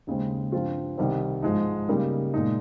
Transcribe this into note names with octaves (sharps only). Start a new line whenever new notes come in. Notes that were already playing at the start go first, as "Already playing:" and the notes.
D#2 C#3 G#3 C4
G2 F3 C4 F4
C2 C3 D#3 G3 C4
G#2 F3 G#3 D#4
C#3 G3 A#3 D#4
A#2 G#3 D#4